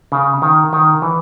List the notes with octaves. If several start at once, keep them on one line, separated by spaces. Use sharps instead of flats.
C#3
D#3
D#3
E3